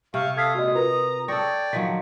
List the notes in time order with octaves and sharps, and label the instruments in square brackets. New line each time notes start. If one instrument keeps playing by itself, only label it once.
[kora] C3 [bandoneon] F5 [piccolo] C#6
[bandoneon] A4 F5 [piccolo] D#6 [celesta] G#6 B6 C7
[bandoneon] A#2 G#3 [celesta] F#4 D#5
[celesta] F4 A#4 B4 [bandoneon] A#5
[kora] A4 C#5 [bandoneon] D5 G5 [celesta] A#6
[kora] D#3 F3 F#3 [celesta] B6